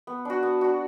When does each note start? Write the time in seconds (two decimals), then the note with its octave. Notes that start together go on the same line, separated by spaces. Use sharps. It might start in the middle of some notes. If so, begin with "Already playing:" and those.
0.07 B3
0.25 D4 F#4
0.43 B3
0.61 D4 F#4